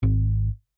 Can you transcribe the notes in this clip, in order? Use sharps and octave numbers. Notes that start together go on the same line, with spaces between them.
G#1